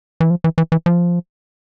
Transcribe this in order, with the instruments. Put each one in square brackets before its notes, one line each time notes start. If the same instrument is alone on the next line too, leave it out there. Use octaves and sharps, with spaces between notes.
[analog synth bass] E3
F3
E3
E3
E3
F3